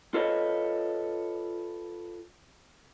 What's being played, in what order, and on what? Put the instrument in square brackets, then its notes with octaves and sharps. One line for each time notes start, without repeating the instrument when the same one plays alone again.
[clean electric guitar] F4 A4 B4 C#5 D#5